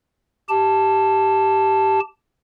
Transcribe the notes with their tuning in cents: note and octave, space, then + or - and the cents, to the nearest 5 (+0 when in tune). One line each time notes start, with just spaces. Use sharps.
G4 -10 A5 +0